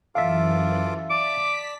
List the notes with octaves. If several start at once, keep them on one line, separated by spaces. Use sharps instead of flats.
F#2 E3 F4 A4 E5 F5 D6
D5 A5 D6 B6